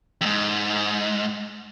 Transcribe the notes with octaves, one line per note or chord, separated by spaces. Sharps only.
F2 G#2